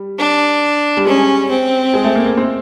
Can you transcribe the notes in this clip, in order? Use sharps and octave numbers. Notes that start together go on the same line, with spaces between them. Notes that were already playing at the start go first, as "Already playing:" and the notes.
Already playing: G3
D4
G3
G#3 C#4
C4
G#3
A3
A#3
A#3
C4